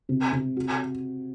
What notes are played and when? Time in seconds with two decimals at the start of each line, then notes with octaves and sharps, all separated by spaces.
0.09 C3
0.32 C3
0.57 F#4